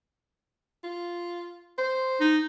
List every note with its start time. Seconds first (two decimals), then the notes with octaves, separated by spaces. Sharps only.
0.84 F4
1.78 C5
2.20 D#4